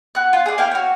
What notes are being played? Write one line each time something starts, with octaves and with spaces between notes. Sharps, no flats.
F#4 F#6
F4
G#4 D5
A#3 E4 F5 G5
F#4 C#5